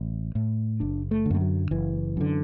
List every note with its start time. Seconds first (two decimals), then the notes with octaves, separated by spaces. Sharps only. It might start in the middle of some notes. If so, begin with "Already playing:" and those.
Already playing: A1
0.35 A2
0.80 F#1 D4
1.11 A3
1.25 D3
1.31 F#2 A3
1.41 F#3
1.71 F#1 E3
2.17 F#2 D3